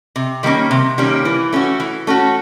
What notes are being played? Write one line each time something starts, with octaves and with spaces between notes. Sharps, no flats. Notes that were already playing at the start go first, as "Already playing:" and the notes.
C3
D#3 G3 A#3 C#4
C3
D#3 G3 A#3 C#4
E3
A3 C#4 F#4
E3
A3 C#4 F#4